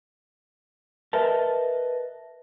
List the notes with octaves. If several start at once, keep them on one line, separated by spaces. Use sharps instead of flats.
A#4 B4 D#5 E5 A5